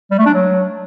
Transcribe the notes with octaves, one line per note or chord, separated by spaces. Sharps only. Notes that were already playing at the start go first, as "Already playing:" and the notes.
G3
A3
D4
F#3